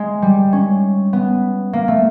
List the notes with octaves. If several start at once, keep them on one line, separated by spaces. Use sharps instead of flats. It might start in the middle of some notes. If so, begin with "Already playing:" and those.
Already playing: G#3
G3
C#4
B3
A#3
A3